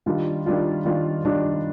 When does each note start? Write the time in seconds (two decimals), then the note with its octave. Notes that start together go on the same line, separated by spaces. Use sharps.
0.06 D#3 G3 D4 F4
0.46 D#3 G3 D4 F4
0.85 D#3 G3 D4 F4
1.25 D#3 G3 D4 F4